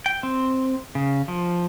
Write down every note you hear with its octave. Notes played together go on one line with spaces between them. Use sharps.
G5
C4
C#3
F3